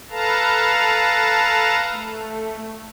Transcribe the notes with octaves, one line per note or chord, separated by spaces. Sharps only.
A4 B4 F5 A5 A#5
A3